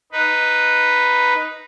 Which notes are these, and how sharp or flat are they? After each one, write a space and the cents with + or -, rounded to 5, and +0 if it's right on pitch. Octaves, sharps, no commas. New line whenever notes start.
D#4 +0 B4 +0